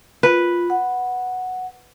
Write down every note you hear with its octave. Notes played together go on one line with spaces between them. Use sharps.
F4 B4
F#5